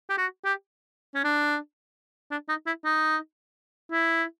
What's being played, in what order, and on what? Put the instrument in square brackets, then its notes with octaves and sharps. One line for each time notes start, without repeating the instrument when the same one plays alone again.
[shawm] G4
F#4
G4
C#4
D4
D4
D#4
E4
D#4
E4